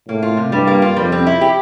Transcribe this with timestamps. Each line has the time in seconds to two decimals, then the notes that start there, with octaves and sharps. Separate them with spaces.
0.09 A2 A#3
0.22 F4
0.37 C3
0.52 G2 G3
0.67 A#3
0.82 F4
0.96 F2 G3
1.12 C4
1.27 E4
1.41 G4